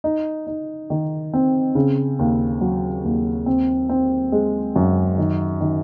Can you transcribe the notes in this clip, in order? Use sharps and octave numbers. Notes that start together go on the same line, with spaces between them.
D#4
D#4
D#3
C4
C#3
D#2
F#3
D#2
C4
C4
G#3
F#2
D#3
D#3